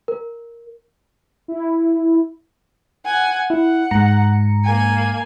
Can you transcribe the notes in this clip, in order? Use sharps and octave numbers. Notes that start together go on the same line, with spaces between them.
A#4
E4
F#5 G#5
E4 F#5
G#2 A#5 C#7
A#3 G#5